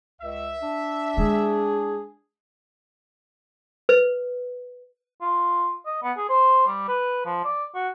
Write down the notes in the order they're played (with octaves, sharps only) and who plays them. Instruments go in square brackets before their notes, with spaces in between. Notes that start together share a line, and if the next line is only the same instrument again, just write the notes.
[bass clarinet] C#2 [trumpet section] E5
[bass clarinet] D4
[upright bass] G#3 E4 [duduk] G#4
[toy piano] B4
[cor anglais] F4
D#5
B3
G#4
C5
G3
B4
F3
D5
F#4